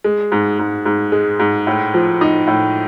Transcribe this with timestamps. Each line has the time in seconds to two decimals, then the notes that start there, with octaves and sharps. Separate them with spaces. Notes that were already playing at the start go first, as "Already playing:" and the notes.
0.04 G#3
0.32 G#2
0.59 G#2
0.85 G#2
1.12 G#3
1.39 G#2
1.67 A2
1.94 F3
2.21 D#4
2.47 A2